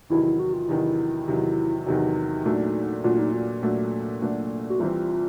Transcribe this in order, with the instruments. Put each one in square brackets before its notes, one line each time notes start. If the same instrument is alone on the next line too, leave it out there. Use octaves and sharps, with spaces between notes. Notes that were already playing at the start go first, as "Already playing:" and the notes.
[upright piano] E2 C3 D#3 F#3 [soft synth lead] E4
[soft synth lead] E4
F#4
F4
[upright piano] E2 C3 D#3 F#3 [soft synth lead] E4
[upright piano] E2 C3 D#3 F#3
[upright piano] E2 C3 D#3 F#3 [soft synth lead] D#4
[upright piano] A#2 F#3 A3 D4 F#4
[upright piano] A#2 F#3 A3 D4 F#4 [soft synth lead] F4
[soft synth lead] D#4
F4
[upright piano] A#2 F#3 A3 D4 F#4
A#2 F#3 A3 D4 F#4
[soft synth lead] F#4
[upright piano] C2 C3 E3 G3 C4 [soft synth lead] F4